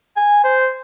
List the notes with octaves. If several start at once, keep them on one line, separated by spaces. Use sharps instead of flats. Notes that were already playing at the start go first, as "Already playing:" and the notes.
G#5
C5